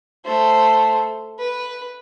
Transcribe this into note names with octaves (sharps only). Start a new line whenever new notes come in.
A3 C5
B4